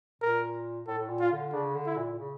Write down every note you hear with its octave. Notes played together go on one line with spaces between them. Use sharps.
A#2 A#4
A2 A4
A2
A#2
F4
D3
C#3 D4
D3
E4
A#2
C#3